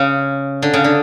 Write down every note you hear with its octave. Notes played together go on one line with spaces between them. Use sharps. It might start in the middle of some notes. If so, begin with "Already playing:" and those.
Already playing: C#3
D3
C#3
D3